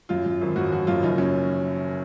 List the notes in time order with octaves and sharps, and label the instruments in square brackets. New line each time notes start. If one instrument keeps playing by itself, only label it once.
[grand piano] F#2 F4
F#2
G#1
F#2 F#4
F3 F#4
F#2 F4
F#1 D#4
F#2 C#4